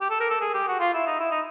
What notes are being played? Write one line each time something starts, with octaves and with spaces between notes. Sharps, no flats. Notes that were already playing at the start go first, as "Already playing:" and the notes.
G4
A4
A#4
A4
G#4
G4
F#4
F4
E4
D#4
E4
D#4